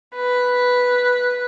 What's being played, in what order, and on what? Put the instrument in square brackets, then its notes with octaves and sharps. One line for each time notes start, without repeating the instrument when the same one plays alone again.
[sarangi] B4